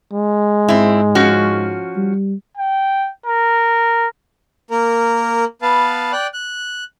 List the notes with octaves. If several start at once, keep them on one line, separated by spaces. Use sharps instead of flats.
G#3
G#2 C4 E4
F3 C#4 F#4
G3
G5
A#4
A#3 A#4
B3 B4 F5 A5
D5 G5 F#6
F#6